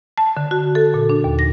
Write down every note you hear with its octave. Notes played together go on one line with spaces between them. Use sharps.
A5
D3
F#4
A4
A#2
D4
D#2
A#6